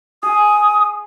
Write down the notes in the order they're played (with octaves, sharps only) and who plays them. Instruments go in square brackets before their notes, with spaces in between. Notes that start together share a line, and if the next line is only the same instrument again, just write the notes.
[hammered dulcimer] G#4 [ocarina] D#6